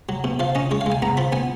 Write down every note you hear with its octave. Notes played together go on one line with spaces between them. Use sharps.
F#3
B2
F3 F5
C#4 D#5
G#3 C#5
F5
G#3
G#5
B3 A#5
F3 B5
B3 G#5